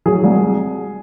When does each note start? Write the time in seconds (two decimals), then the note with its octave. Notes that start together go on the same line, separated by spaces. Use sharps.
0.06 F#3 G#4
0.24 C2